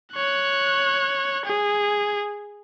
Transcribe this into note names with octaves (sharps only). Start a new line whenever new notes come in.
C#5 F#6
G#4